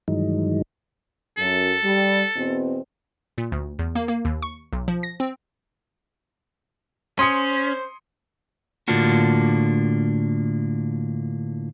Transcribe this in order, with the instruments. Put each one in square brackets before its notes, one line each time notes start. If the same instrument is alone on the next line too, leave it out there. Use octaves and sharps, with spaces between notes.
[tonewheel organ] G2 D#3 E3 F#3 G#3 D#4
[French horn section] F#2 [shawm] A4
[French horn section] G3
E2 B2 C4
[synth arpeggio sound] A#2
D2
E2
A#3
A#3
D#2
C#6
B1
F3
A#6
C4
[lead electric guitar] C#4 [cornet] C5 [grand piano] C6 D#6 C#7
[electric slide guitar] A2 D3 A#3 D4 F4 F#4